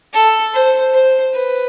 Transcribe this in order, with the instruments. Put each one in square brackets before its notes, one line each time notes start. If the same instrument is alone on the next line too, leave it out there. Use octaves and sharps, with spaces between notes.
[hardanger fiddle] A4
C5
C5
B4